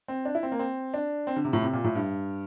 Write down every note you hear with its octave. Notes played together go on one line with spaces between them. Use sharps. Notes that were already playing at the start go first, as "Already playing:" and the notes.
C4
D4
E4
C4
A#3
C4
D4
C4
D3
C3
A2
C3
A#2
A2
G2